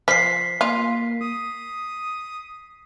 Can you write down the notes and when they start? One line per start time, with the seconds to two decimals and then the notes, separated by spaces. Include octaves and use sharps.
0.08 F3 B6 C7
0.61 A#3 F4
1.21 D#6